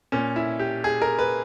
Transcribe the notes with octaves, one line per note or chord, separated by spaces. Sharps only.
A#2 C#4
E4
G4
G#4
A#4
B4